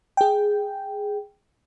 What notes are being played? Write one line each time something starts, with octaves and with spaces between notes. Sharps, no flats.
G#4 G5